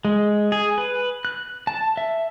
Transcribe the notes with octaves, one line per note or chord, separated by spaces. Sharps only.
G#3
G#4
B4
F#6
A5
E5